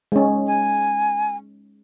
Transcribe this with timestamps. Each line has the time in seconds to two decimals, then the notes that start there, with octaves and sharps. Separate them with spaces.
0.12 G#3 C#4
0.47 G#5